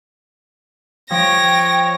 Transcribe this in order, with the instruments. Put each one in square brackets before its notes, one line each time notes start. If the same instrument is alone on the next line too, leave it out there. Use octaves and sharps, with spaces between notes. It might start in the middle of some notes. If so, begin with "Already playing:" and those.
[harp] F3 [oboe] C#5 [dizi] G5 [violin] A#6